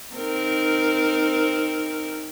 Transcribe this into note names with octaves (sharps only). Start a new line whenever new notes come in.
C4 D#4 A#4